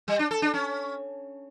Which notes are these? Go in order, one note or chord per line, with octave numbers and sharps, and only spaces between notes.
G3
D4
A4
D4
C#4